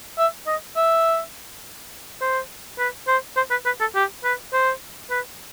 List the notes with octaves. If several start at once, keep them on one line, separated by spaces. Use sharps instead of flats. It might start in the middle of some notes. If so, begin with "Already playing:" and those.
E5
D#5
E5
C5
B4
C5
C5
B4
B4
A4
G4
B4
C5
B4